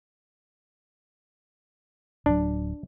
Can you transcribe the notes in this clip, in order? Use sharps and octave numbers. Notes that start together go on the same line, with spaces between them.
D1 F#3 D4